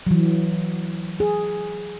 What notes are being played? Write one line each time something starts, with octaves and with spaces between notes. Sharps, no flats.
E3 F#3
G#4